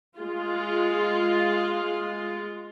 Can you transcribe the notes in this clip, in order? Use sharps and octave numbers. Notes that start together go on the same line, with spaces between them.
G#3 F4